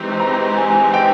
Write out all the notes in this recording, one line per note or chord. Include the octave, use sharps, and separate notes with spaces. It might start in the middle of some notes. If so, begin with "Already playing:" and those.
Already playing: E3 G#3 C4 D#4 G4
A#5
G#5
G5